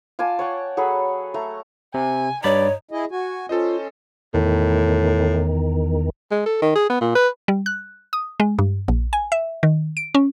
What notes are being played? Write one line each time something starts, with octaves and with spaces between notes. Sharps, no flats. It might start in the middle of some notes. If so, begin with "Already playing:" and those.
F4 D5 G#5 A5
C#5 F#5 G5
F#3 G#4 A4 B5
A3 A#5
C3 G#5
G2 D#4 C#5 D5 B5
E4 G#4 D#5
F#4 G#5
C#4 F4 A4 C5 D#5
E2 A2 D#3
G#3
A4
D#3
G#4
B3
A#2
B4
G3
F#6
D#6
G#3
G2
A#1
G#5
E5
D#3
D7
C#4